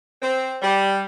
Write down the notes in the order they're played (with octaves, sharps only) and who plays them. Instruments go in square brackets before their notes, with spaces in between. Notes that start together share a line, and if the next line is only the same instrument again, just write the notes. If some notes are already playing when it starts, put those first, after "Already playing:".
[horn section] C4
G3